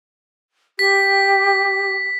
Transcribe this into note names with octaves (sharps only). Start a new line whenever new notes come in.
G4 B6